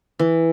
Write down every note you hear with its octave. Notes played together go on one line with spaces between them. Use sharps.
E3